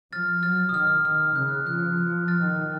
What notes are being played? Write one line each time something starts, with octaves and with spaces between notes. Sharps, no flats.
F3 F6 A6
F#3 F6 A6
D#6
D#3 F6
D#3 F6
C#3 F#6
F3 F#6
F3 F#6
F6 A6
D#3